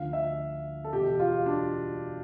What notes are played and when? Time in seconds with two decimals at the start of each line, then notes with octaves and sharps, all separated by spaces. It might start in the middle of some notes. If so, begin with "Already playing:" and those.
Already playing: D2 D3 F3 F5
0.13 E5
0.84 A4
0.93 E2 B2 G4
1.19 F4
1.46 D4